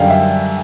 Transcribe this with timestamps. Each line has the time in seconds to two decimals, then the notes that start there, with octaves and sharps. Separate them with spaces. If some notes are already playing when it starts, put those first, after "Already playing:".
Already playing: F#2 D3 G3 F5 G5
0.10 E5